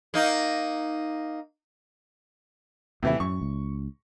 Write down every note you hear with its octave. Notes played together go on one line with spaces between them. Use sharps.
A#3 D#4
D#2 A2 C3 E3 E4
F#2 C#6
C#2